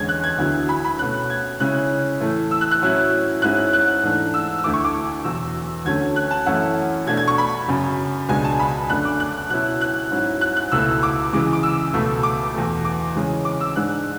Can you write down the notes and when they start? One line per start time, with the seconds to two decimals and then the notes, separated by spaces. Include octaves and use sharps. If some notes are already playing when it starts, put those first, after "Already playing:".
Already playing: E2 D3 G#3 C#4 G#6
0.09 F#6
0.24 G#6
0.38 D2 D3 F#3 B3 E4
0.69 B5
0.85 B5
0.99 B2 A3 C#4 F#6
1.30 G#6
1.60 C#3 G#3 C#4 E4 F#6
2.20 A2 E3 A3
2.51 E6
2.61 F#6
2.71 F#6
2.82 A2 F#3 C#4 E4
3.42 G#2 G#3 C#4 E4 F#6
3.73 F#6
4.03 G#2 E3 A3 D4
4.34 E6
4.59 E6
4.64 D2 D3 A3 E4 D6
4.74 C#6
4.84 D6
5.24 E2 B2 F#3 E6
5.85 D2 D3 F#3 A3 C#4 G#6
6.16 F#6
6.31 A5
6.46 F#2 E3 A3 C#4 E4 F#5
7.07 B2 A3 D4 G#6
7.17 G#6
7.28 C#6
7.38 B5
7.68 F#2 C#3 F#3
8.29 C#2 B2 G#3 D4 G#5
8.44 A5
8.59 B5
8.90 F#2 D3 A3 D4 F#6
9.05 D6
9.20 F#6
9.50 B2 F#3 C#4 E4 F#6
9.81 F#6
10.11 G#2 F#3 C#4 E4
10.41 F#6
10.57 F#6
10.72 C#2 B2 A3 E4 E6
11.03 D6
11.33 C#3 E3 G#3 D6
11.53 D6
11.63 E6
11.93 C#2 B2 A3
12.23 D6
12.54 E2 B2 A3
12.85 D6
13.15 C#3 E3 G#3 C#4
13.45 D6
13.61 E6
13.76 G#2 G#3 D4 F#6